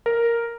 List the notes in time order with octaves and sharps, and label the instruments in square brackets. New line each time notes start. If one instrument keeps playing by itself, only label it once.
[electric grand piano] A#4